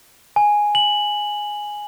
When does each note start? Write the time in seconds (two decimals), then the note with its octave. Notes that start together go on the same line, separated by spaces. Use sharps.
0.36 G#5
0.75 F#7